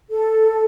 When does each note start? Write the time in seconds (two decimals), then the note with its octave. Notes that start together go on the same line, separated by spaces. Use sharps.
0.10 A4